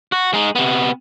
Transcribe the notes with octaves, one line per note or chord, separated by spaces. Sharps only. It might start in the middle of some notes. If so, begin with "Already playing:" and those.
F#4
G#3 D#4
C3 B3